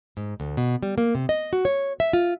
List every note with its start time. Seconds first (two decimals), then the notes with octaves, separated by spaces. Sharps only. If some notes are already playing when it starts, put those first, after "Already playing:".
0.17 G#2
0.40 D2
0.57 B2
0.83 G3
0.98 A#3
1.15 C3
1.29 D#5
1.53 F#4
1.65 C#5
2.00 E5
2.13 F4